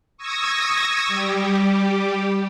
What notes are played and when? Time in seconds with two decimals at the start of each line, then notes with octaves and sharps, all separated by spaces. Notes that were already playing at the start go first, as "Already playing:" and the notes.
0.17 C#6 D#6 E6 G#6 A#6
1.07 G3 G4